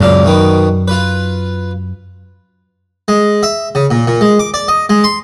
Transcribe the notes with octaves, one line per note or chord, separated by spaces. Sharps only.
C#2 F#2 A#2 F5
B2 D#3 B3
F4 B4
G#3
E5
C#3
A#2
A#2
G#3
D6
D5
D#5
G#3
C6